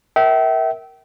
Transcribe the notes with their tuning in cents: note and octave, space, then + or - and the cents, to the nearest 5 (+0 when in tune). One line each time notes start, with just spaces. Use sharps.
A#4 +0 E5 -25 G5 -35